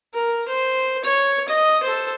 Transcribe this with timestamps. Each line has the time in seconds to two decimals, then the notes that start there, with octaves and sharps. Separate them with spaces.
0.14 A#4
0.48 C5
1.05 C#5
1.49 D#5
1.83 A4 C5